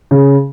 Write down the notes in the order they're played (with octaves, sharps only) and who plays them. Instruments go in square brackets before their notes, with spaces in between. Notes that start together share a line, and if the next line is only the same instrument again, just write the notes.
[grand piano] C#3